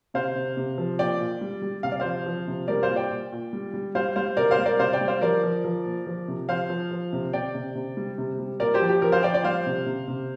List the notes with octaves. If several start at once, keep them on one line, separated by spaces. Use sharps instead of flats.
C3 C5 F5
C3
C3
F3
A#2 D5 G5
A#2
G3
G3
C3 F5
D5
F3 C5 F5
F3
C3
G3 A#4 D5
C5 F5
A#2
D5 G5
A#2
A#2
G3
G3
G3 C5 F5
G3 C5 F5
C3 A#4 D5
C5 F5
G3
A#4 D5
C3 C5 F5
D5 G5
G3
C5 F5
F3 A#4 D5
F3
F3
A#2
F3
C3
F3 C5 F5
F3
F3
C3
C3 D5 G5
C3
C3
G3
C3
G3
A#2 A#4 D5
G4 C5
F3
G4
F3 A#4
C5 F5
F3 D5 G5
D5 G5
G3 C5 F5
C3
C3
C3